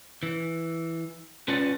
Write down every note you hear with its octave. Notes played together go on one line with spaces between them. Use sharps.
E3
C#4 F4 B4 D5 F#5 A5